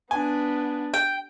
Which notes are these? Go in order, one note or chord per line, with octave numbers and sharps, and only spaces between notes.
B3 D4 G#5
G5